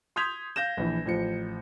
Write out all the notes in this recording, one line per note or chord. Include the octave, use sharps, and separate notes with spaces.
C6 D#6 G6 G#6 B6 F7
F5 G6 A#6 E7
A#1 E3
A1 F3 C#7